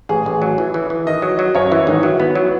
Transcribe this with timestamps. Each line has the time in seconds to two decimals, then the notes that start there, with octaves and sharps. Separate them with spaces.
0.09 A1 G#4
0.26 A1
0.42 F#3
0.58 E3
0.74 E3
0.90 E3
1.07 D#3 D#5
1.22 F#3
1.39 F#3
1.55 F#2 C#5
1.71 E3 E4
1.87 G#1 D#4
2.03 F#3 E4
2.20 B3
2.35 F#3